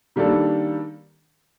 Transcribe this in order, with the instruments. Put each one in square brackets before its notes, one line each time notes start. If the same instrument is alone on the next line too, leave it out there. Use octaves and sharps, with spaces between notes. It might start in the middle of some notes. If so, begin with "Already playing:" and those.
[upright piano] D#3 G3 A#3 D4 A4